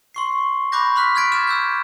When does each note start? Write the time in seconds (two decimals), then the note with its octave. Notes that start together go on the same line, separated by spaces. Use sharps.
0.14 C6 C#6 C7
0.72 B5 C#6 D6 F#6 G6 A#6
0.96 B5 C6 F6 F#6 B6
1.15 F6 F#6 G#6 A6 B6 D7
1.32 D6 F6 G#6 B6 E7
1.47 E6 G6 G#6